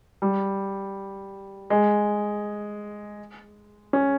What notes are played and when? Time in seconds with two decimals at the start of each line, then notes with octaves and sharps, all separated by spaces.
0.22 G3
1.70 G#3
3.93 C#4